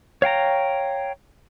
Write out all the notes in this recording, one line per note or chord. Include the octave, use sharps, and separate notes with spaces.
C#5 F5 G5 A#5